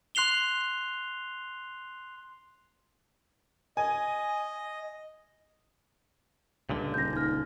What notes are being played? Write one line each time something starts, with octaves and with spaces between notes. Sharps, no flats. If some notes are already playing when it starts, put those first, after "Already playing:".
C6 F#6 C7 F7 G7
D#5 G#5
C#2 G2 A#2 D3
D#1 G6 A#6
D#4 F6